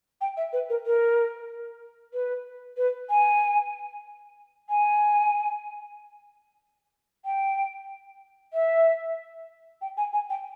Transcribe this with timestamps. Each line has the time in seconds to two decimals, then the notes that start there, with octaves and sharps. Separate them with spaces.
0.21 G5
0.37 E5
0.53 B4
0.70 A#4
0.86 A#4
2.13 B4
2.77 B4
3.10 G#5
4.69 G#5
7.25 G5
8.53 E5
9.81 G5
9.97 G#5
10.13 G#5
10.30 G5